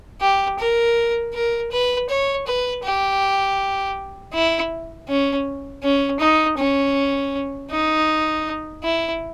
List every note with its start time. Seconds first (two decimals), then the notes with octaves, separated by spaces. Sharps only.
0.21 G4
0.60 A#4
1.34 A#4
1.71 B4
2.09 C#5
2.47 B4
2.83 G4
4.33 E4
5.08 C#4
5.83 C#4
6.20 D#4
6.58 C#4
7.71 D#4
8.84 E4